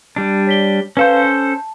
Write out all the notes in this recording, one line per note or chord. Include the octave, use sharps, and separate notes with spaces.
G3 D4
C#5 B6 G7
C#4 A4 B4 C5 F5 G6
A5